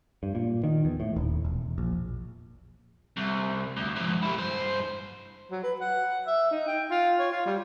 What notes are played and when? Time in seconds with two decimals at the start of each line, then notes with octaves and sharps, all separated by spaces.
0.23 G2
0.35 A#2
0.64 D#3
0.85 E2
1.00 A2
1.16 D#1
1.45 E1
1.78 A#1
3.17 C2
3.77 D2
3.96 F2 G#2
4.23 E4 G4
4.38 G2 C5
5.51 F#3
5.63 B4
5.80 F#5
6.27 E5
6.51 D#4
6.67 G5
6.91 F4
7.19 C#5
7.32 F4
7.46 G3